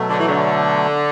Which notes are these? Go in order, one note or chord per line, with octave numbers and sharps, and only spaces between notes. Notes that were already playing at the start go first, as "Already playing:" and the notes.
Already playing: B2 F#3 A3
D3
E3
D3